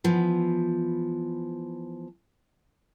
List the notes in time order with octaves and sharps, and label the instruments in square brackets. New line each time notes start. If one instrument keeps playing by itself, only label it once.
[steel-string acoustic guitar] E3 F3 B3